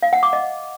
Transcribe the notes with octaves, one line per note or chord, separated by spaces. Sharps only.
F5
F#5
D6
D#5